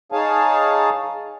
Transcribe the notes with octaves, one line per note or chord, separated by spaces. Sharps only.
D#4 G#4 C#5 F5 G#5 A5